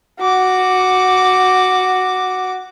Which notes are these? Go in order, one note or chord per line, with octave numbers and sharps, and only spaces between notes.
F#4 D6